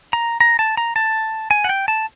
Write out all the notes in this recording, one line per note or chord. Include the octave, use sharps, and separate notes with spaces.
A#5
A#5
A5
A#5
A5
G#5
F#5
G5
A5